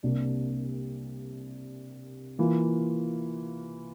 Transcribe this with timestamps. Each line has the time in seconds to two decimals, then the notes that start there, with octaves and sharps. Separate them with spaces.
0.03 C2 C3 G3 A#3 D4
2.39 E3 A#3 F4